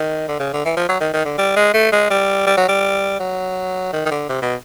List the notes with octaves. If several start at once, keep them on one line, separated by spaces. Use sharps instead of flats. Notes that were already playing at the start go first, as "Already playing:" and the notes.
Already playing: D#3
D3
C#3
D3
E3
F3
F#3
D#3
D#3
D3
G3
G#3
A3
G#3
G3
G3
F#3
G3
F#3
D#3
D#3
D3
C3
B2